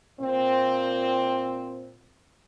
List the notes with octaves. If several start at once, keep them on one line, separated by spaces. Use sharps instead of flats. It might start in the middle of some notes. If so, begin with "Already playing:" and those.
A#2 C4